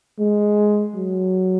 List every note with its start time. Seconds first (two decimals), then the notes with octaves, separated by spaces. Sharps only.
0.18 G#3
0.95 F#3